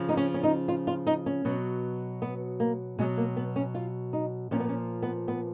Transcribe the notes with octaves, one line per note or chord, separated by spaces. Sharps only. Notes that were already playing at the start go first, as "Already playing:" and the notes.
Already playing: C#3 F3
D#4
C#4
C#4
D#4
F4
F4
D#4
C#4
B2 F#3
B3
A#3
B2 F#3 G#3
A#3
B3
C#4
F4
D#4
A#2 F3 C#4
B3
C#4
B3
B3